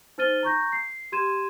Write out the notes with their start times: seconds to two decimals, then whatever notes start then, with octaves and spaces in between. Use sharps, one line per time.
0.18 D#4 C5 F6 A6 D#7 G7
0.43 A#5 C#6 G6 A#6
0.72 C7
1.12 G4 C6 G#6 D#7 E7